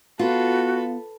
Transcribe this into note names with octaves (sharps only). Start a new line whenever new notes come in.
B3 F4 F#4 A4 B4